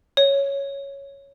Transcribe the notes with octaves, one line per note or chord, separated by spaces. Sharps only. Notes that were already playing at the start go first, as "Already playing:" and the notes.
C#5